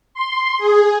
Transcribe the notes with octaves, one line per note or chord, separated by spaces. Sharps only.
C6
G#4